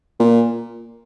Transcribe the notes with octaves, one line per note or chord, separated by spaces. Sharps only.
A#2